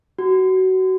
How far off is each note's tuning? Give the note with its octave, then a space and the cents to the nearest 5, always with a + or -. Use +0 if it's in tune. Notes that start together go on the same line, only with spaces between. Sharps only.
F#4 +25